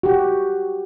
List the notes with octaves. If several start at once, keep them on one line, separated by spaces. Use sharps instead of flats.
F#4 G4